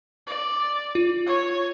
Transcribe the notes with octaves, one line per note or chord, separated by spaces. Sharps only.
D5
F4
C#5